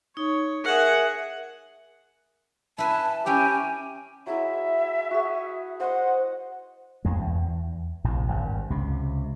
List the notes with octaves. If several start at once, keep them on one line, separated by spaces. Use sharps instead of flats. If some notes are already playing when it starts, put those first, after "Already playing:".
D#4 C#5
G#4 A#4 E5 F#5
E4 B4 G#5 A5
C#4 E4 G4 G5 G#5
F#3 G#3 E4 E5
F#4 G#4
C5 D#5 F#5
F2 G#3
E2
A#1 A2 C3
G#1 G2
C#2 C3